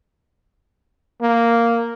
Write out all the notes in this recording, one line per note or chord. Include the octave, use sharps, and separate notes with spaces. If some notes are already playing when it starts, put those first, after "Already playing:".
A#3